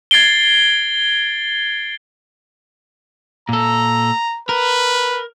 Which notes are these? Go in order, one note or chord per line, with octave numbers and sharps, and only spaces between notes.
G#6 A6 C7 D7 G7
A#2 A4 A#5
A#4 B4